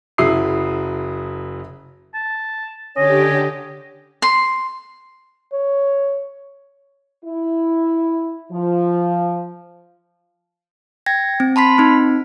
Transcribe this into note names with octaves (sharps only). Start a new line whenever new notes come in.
F#1 F#3 E4 D#6 C7
A5
D3 C#4 G4 C#5 D#5
C6
C#5
E4
F3
G5 G#6 A#6
C4
A5 B5 C6 B6
C4 D#4